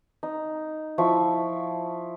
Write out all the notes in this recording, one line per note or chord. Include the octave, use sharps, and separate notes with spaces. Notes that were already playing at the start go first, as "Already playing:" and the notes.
D#4
F3 E4 C#6